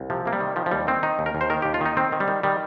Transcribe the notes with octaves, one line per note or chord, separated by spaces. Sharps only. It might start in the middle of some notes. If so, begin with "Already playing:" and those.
Already playing: C2
C3 F3
C3 A#3
G3
D#3
D#3 F3
F3
D#2 G3
D#3 C4
D#3 D#4
D#2
A#4
D#2
C5
D#3 A#4
D#2 G4
F4
D#3 D#4
D#3 C4
D#3
G3
D#3
D#3 G3